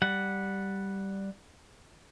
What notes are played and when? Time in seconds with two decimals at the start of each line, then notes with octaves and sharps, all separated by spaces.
0.02 G3 F#5